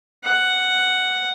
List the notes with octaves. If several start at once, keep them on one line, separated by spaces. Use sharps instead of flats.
F#5